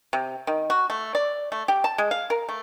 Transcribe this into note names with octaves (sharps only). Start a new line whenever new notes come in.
C3
D#3
F#4
A3
D5
A3
G4
A5
G#3
F5
A#4
A3